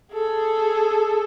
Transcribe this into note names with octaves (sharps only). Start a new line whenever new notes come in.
G#4 A4